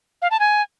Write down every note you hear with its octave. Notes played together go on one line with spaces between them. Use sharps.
F5
A5
G#5